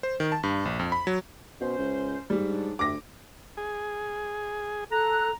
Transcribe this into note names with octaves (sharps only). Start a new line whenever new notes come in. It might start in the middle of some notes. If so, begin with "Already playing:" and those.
C5
D#3
A5
G2
A#1
F2
B5
F#3
B2 C#4 C5
C#2
G#2 G3
F#3 D4
D2 G4 E5 D6 A#6
G#4
A4 A#5 F#6